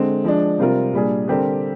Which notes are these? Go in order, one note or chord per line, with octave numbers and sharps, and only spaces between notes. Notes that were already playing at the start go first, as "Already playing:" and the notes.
Already playing: D3 G#3 C4
F3 G#3 D4
C3 G3 C4 F4 A#4
A#2 G3 D4 G#4
D3 G3 C4 G4 A#4